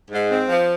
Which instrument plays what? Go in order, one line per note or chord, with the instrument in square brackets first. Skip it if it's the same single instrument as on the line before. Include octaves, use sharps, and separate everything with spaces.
[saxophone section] G#2
C4
F3